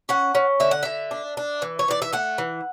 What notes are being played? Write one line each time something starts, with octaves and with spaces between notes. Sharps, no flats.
C#4 F#5
C#4
D3 E5
F#5
D3 E5
D4
D4
E3
C#5
E3 D5
E5
A3 F#5
E3